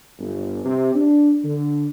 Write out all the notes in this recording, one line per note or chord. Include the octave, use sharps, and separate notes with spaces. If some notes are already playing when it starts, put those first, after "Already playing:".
G1
C3
D4
D3